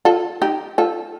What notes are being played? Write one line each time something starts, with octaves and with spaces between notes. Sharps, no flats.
F4 A4
D#4 G4
F4 A4